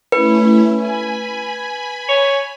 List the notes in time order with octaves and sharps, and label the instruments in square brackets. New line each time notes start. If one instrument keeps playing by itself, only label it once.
[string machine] A3 C#4 E4 [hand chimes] B4
[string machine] G#5 B5
[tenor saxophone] C#5